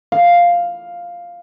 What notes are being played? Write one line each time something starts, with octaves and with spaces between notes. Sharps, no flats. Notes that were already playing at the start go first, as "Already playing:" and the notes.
F5